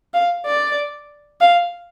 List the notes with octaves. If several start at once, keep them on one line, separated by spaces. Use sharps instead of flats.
F5
D5
F5